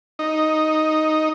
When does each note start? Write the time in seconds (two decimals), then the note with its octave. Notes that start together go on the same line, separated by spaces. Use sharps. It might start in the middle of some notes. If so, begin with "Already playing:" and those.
0.19 D#4